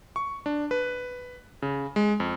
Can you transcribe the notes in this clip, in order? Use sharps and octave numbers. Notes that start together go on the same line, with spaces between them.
C#6
D4
B4
C#3
G#3
F2